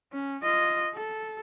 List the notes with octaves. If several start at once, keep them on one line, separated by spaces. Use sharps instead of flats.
C#4
F4 D#5
A4